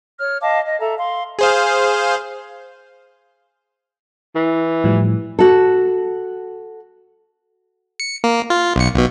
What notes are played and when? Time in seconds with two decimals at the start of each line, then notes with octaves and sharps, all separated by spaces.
0.20 C#5 F6
0.42 D#5 F5 A5 D6
0.65 D#5
0.80 A4 E5 A5 A#5
0.99 F5 C6
1.39 G#4 C5 F5
4.36 E3
4.84 A2 F3 G3
5.39 F#4 A4
8.00 C#7
8.24 A#3
8.50 F4
8.76 B1 C#7
8.94 B1 B2